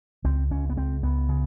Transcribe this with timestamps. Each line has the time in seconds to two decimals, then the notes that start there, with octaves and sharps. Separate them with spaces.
0.24 C#2 C4
0.50 C#2 C#4
0.70 B3
0.76 C#2 C4
1.03 C#2 B3
1.29 C#3